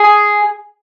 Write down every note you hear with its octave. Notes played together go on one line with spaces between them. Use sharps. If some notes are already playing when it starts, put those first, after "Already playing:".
Already playing: G#4